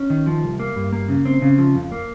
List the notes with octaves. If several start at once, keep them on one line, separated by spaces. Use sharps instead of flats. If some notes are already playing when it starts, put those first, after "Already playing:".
Already playing: C#4
D#3
F3
C2
A#3
G2
A#3
C#3
C4
C#3
F3
F2
A#3